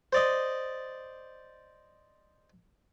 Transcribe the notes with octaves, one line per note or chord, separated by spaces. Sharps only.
C5 D5 D#5